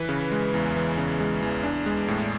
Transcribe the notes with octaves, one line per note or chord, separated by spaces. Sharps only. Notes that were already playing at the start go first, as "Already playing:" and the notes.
Already playing: E3 B4
C#3
G#3
E2
E3
C#3
G#3
E2
D4
G#3
A2